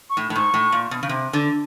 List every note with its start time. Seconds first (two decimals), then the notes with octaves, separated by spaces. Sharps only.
0.10 C#6
0.17 A2
0.30 A2
0.35 G#2 C#6
0.54 A2
0.72 A#2
0.91 B2
1.03 C#3
1.09 C3
1.33 D3